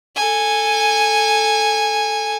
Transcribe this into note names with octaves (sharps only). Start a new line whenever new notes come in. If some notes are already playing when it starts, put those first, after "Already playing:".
A4 G#5